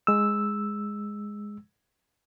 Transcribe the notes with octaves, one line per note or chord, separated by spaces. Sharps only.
G#3 E6